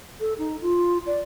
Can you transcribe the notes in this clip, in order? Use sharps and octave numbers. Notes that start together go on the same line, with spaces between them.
A4
D#4
F4
D5